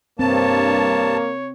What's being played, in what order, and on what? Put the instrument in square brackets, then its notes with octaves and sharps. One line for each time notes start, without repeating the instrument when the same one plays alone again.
[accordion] G2 A5 [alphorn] A#3 [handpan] C4 [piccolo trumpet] C#5